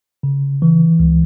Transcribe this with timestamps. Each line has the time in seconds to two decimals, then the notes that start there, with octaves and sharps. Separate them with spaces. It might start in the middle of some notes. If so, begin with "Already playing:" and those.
0.23 C#3
0.62 E3
0.99 C#2